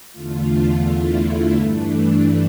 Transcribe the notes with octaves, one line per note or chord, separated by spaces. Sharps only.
E2 D3 A3 F4
E4
G2 E3 A3 D4